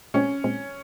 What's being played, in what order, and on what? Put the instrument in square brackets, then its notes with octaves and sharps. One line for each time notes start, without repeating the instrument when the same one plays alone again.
[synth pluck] A#2 G#3 C4 [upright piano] C#4
[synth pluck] A#2 G#3 C4